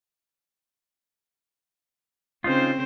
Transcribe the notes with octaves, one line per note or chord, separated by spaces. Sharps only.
C#3 C4 C#4 D#4 F4 C5